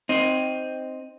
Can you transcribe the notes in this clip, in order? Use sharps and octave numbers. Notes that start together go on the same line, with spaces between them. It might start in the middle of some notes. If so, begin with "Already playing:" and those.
C4 D#4